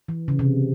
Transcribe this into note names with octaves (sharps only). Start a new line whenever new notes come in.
E3
C#3
C3